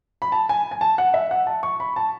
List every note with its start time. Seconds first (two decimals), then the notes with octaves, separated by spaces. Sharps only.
0.22 B5
0.32 A5
0.49 G#5
0.71 G#5
0.81 A5
0.98 F#5
1.14 E5
1.31 F#5
1.47 A5
1.63 C#6
1.80 B5
1.96 A5